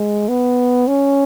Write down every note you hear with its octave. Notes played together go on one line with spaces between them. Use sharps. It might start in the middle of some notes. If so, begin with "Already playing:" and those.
Already playing: G#3
B3
C#4